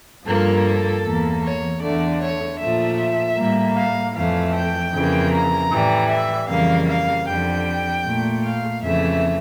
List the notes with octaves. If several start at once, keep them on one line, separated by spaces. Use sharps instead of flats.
G2 F3 A#3 A4
E2 E3 A#3
C#5
E2 D3 A3 D5
C#5
A#2 F3 A3 E5
A2 G3 A#3
F5
F2 E3 A3 F5
G5
F2 C#3 E3 A#3
A#5
A2 E3 G3
E5
F2 C#3 E3 G3 A#3 F5
F5
F2 D3 G3 G5
A#2 A3
F5
F2 C#3 E3 A3 E5